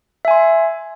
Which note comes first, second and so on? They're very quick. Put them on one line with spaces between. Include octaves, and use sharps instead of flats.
E5 G#5 C6